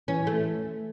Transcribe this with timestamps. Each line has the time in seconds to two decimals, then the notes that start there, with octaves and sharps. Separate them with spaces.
0.08 E3 C#4
0.27 A3